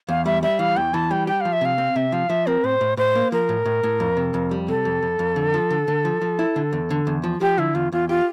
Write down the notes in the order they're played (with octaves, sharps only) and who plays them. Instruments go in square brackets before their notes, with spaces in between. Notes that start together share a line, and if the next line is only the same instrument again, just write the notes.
[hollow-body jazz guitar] E2 [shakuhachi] F5
[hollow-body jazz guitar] G3 [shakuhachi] E5
[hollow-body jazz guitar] G3 [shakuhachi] E5
[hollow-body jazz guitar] E3 [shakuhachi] F5
[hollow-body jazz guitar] E2 [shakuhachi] G5
[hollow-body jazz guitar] E3 [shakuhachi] A5
[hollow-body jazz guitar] G3 [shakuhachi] G5
[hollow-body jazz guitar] G4 [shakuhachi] G5
[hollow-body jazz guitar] F3 [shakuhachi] F5
[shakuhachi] E5
[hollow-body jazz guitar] C3 [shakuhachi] F5
[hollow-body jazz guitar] C4
[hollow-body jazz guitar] C3 [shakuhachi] E5
[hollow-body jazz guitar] F3 [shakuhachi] F5
[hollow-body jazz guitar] F3 [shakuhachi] E5
[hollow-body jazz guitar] C4 [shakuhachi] A#4
[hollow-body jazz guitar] A2 [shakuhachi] C5
[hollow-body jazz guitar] A2
[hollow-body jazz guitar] A2 [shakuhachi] C5
[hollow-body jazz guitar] A#3
[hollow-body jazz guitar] F3 [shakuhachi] A#4
[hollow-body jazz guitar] A2
A2
A2
F2
C3
F2
G3
[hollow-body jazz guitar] C3 [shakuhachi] A4
[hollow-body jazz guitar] F2
F2
F2
D3
F3
D3
D3
F3
F3
E4
D3
E2
D3
E2
F3
[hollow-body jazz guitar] F3 [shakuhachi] G4
[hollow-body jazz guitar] D3 [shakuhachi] E4
[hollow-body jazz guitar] E2 [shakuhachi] F4
[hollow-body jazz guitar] E2 [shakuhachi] F4
[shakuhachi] F4 [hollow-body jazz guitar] G4